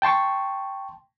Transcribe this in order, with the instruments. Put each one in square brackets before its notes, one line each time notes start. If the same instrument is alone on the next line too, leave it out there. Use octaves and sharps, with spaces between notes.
[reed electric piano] G5 A5 C6 C#6